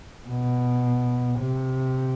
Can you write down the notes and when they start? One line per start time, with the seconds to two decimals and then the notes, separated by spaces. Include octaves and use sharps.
0.28 B2
1.39 C3